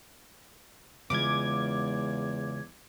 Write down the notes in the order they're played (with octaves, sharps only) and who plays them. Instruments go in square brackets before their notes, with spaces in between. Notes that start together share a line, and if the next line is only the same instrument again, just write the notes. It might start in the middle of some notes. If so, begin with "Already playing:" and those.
[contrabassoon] E2 [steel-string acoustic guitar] C#3 G#3 F4 [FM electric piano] D6 G#6